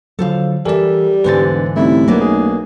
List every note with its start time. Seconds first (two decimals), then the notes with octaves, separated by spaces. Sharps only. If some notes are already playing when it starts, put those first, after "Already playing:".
0.19 D3 F3 F#3 A4 C5 F5
0.65 E3 G3 A4 A#4 D5 E5
1.24 E1 G#2 D3 E3 B4 C5 A6
1.76 C2 A3 C#4 D#4 E4
2.08 B1 A#3 B3 D4
2.21 G#4